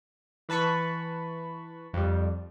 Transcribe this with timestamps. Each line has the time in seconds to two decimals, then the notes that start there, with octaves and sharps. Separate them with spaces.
0.49 E3 B4 A5 B5 C#6
1.93 F2 G3